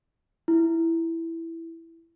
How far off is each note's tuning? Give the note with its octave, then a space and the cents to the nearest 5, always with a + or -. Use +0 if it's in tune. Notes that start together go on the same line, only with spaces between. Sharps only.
E4 +5